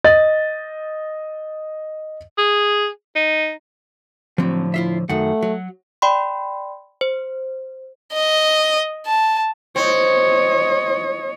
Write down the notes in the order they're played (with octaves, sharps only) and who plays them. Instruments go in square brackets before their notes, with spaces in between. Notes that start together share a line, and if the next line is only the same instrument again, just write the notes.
[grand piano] D#5 A6
[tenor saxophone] G#4
D#4
[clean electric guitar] A2 D3 F3 [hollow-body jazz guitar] F#3 C4
[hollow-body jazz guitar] E4 F4 E5
[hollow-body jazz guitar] F#2 D#3 [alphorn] A3 [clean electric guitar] F#5
[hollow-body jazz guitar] F#3
[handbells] D5 G5 B5 C6
C5
[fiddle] D#5
A5
[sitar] C4 [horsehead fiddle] C#5 D#5